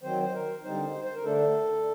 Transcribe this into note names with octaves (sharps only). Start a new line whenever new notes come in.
D#3 F#3 C4 C5
C5
A#4
D3 G3 C4 D#4 C5
C5
A#4
D3 A3 D4 A4